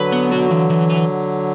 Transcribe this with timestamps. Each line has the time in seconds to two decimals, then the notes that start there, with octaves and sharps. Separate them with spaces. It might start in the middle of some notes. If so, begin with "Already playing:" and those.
Already playing: D3 F#3 B4
0.12 B3
0.32 F#4
0.51 E3
0.70 E3
0.90 B4